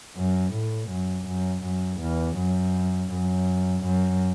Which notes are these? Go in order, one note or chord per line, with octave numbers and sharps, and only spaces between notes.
F#2
A2
F#2
F#2
F#2
E2
F#2
F#2
F#2